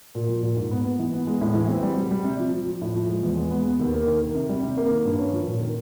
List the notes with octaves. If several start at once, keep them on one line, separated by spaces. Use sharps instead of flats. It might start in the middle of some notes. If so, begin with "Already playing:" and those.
A#2
F3
A#2
G#2
B3
B3
E3
B3
G#3
A2
E3
C4
G3
G3
G3
C3
F3
F3
F3
A2
F3
G#3
E2
G#3
B3
B3
D#2
A#3
D#3
D#3
C3
G3
C3
A#3
D#3
G2
C#4
F3
A#2
D#3